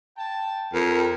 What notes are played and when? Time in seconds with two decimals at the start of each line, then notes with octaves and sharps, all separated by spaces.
0.17 G5 A5
0.73 F2 A#4